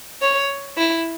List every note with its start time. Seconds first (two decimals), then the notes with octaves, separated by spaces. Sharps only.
0.22 C#5
0.77 E4